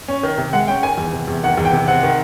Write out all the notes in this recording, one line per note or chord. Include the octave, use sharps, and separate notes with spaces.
C#4
D#3
C3
G#3 F#5
C#4 G5
D#3 G#5
E2
C3
E2
D#3 F#5
E2
G5
C3
C4 F#5
D#3